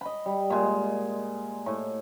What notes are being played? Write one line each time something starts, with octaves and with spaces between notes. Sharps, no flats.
D#5 B5
G3
A#2 G#3
A2